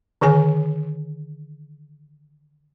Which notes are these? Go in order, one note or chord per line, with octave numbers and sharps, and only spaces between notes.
D3 D#3 G#4 C#5 G#5